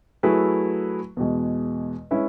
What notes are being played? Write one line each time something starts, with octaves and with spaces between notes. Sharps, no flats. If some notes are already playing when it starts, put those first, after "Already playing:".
F#3 A3 E4 G#4 B4
E2 B2 G#3
G#3 C#4 E4 B4 E5